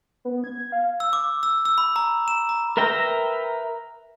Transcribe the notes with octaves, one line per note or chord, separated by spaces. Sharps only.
B3
G#6
F5
E6
D6
E6
E6
B5
A#5
E7
A#5
A#4 B4 E5 G5 A#5